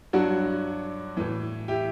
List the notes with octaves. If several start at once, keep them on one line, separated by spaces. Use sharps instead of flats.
G2 F#3 D4 F#4
A2 E3
E4 G4